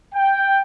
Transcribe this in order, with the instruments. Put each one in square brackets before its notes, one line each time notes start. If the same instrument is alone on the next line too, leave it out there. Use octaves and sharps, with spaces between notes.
[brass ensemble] G5